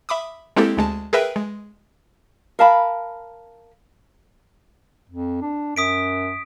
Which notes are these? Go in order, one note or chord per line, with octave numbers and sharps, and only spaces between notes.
E5 B5 D6 D#6
G#3 A#3 C4 E4 G4 A4
D2 G#3 A5
G#4 A#4 B4 E5 G5
G#3
A#4 F5 A5 B5
F2
D4
F#2 D#6 B6 D7